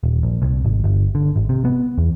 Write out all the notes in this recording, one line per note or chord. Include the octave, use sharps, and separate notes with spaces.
D#1
A#1
C2
G#1
G1
D3
G#1
C3
B3
E2